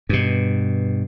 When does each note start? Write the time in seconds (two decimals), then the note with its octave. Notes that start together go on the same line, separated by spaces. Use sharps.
0.09 G2 B2